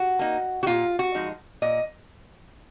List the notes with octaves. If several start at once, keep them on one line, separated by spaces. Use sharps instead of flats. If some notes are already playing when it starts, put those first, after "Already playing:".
Already playing: F#4
A#3 D#4
F#4
A#2 F4
F#4
F3 G#3 D#4
A#2 D#5